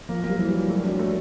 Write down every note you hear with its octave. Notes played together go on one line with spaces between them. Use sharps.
F3 A#3
F#3 A#3
G3
E3 F#3
E3 G3
F#3 A3
D4
A3